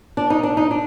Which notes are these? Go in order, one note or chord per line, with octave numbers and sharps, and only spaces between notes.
D4
D#4
D4
D#4
D4